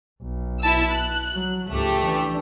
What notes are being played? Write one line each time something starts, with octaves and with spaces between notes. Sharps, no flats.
B1
E4 A5 E6
F#6
F#3
C#2 G#2 A3 G4
E3 D4